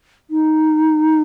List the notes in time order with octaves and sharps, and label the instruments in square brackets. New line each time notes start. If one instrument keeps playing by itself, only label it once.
[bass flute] D#4